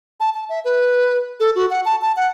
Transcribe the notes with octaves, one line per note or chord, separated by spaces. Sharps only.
A5
A5
E5
B4
A4
F#4
F#5
A5
A5
F#5